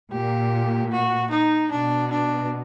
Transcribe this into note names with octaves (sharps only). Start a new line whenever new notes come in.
A#2 G4
F#4
D#4
B2 D4
D4